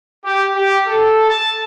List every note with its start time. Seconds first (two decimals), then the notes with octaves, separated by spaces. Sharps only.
0.24 G4
0.55 G4
0.87 A4
1.29 A5